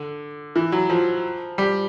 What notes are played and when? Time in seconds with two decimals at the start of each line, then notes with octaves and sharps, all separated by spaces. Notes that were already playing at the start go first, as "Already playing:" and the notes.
Already playing: D3
0.56 E3
0.72 F#3
0.90 F3
1.58 G3